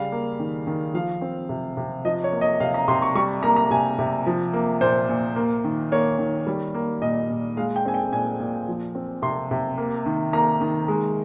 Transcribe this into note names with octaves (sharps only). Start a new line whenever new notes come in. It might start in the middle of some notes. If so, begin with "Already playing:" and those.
Already playing: C#3 G3 F5
A#3
D#3
D#3
F3 F5
C4
C3
C3
F3 D#5
C#5
A#3
D#5
C3 F5
A#5
C3 C6
C#6
G3 C#6
A#3 A#5
A#5
C3 G#5
C3
F3
A#3
A#2 C5
A#2
A#3
D#3
A#3 C#5
D#3
G3
A#3
A#2 D#5
A#2
G#3 F5
G5
C4 G#5
G5
A#2 G#5
A#2
F3
C4
C3 C6
C3
A#3
D#3
A#3 A#5
D#3
G#3